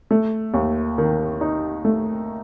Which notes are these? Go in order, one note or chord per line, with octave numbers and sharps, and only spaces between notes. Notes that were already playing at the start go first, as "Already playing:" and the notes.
A3
D#2
D#3
D#4
A3